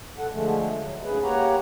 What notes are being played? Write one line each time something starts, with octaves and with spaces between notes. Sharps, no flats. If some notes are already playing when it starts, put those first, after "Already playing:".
B2 A4 F#5
D3 F3 G#3 A3
F#3
D2 G#2 C#3 G#4 B4
A#3 G4 C#5 F#5 A#5